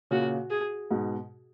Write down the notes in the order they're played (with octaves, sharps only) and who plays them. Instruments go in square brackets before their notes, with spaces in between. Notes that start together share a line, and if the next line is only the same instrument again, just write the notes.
[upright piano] A#2 C#3 [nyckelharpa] F#4
[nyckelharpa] G#4
[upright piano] G#2 B2